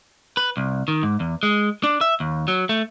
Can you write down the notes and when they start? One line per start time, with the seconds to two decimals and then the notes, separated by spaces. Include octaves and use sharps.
0.37 B4
0.57 C2
0.88 D#3
1.03 G#2
1.20 E2
1.43 G#3
1.84 D4
2.01 E5
2.20 D#2
2.48 F#3
2.69 A3